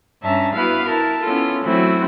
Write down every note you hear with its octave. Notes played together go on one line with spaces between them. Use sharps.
G2 C#4 E5 A5 A#5
B3 E4 F#4 B4 F5 B5
E4 A#4 A5
B3 C#4 E4 F4 A4
E3 F#3 A3 C4 E4 F#4